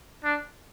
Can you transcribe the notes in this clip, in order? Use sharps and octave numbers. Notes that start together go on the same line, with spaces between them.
D4